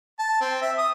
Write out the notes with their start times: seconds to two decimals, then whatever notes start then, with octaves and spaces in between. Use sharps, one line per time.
0.19 A5
0.41 C4
0.62 E5
0.78 D#6